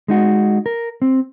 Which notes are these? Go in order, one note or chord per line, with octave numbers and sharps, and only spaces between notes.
G#3 D#4 F#4
A#4
C4